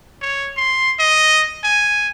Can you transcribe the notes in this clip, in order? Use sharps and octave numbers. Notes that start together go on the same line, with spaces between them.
C#5
C6
D#5
G#5